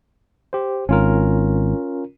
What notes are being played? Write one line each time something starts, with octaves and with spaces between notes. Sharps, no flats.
G4 C5
G#1 C#4 F4 A#4